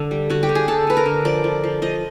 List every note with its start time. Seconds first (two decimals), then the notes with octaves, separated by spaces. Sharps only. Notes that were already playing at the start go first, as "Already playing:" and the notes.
Already playing: D3 A4
0.11 G3
0.30 D3 F#4
0.43 G4
0.49 D3
0.55 G#4
0.68 D3 A4
0.87 D3 B4
0.97 A#4
1.06 D3
1.25 F3 D5
1.44 F3
1.64 F3
1.82 F3 D#5